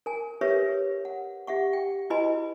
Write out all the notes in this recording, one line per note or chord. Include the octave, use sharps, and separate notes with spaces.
A#4 G#5
G4 A#4 B4 C#5 E5
F#5
G4 E5 F#5 C#6
G5
E4 F#4 B4 D#5 G#5 B5